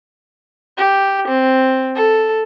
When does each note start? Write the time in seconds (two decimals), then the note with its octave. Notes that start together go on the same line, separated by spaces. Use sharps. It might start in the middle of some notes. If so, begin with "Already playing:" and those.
0.77 G4
1.27 C4
1.95 A4